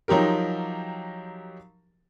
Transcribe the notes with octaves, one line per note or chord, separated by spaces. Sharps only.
F3 F#3 D#4 G4 A#4